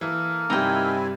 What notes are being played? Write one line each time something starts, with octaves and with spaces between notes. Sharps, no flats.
E3 A#3 A4 A#4
G2 C3 G3 C4 D#4 E4 G5 G#5